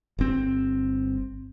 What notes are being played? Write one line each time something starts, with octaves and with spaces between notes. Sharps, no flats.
G1 C4